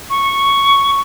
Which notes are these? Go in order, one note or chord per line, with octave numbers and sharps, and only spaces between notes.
C#6